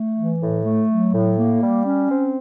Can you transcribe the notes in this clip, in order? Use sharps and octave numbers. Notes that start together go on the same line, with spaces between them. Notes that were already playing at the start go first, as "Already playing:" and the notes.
Already playing: A3
E3
A2
A3
F#3
A2
A#3
G3
C#4
C4